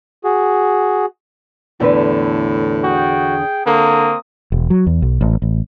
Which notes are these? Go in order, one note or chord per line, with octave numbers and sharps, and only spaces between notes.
F#4 G#4
E2 A2 D3 B4
F#4 G#4 G5
D3 A#3 C4 A#5 D#6
E1
F#3
E2
B1
A1
A1